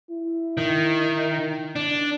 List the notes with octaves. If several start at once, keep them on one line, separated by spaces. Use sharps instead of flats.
E4
D#3
D4